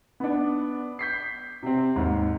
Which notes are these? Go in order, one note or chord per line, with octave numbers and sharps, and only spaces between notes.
B3 D4
G6 B6 C7
C3 C4
D#2 G#2